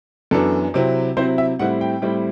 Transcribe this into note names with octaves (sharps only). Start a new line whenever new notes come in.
F#2 E3 B3 D4 A4
C3 F#3 C4 E4
C3 F#3 C4 E4 C5
E5
A2 G3 C4 E4 F#5
G5
A2 G3 C4 E4